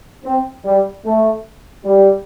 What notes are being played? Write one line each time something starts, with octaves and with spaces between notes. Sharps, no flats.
C4
G3
A3
G3